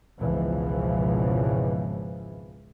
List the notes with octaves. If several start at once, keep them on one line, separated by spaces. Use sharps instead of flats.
G#1 C#2 B2 E3 F3